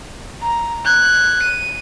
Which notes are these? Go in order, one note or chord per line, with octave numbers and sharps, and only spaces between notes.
A#5
F#6 G#6
D#7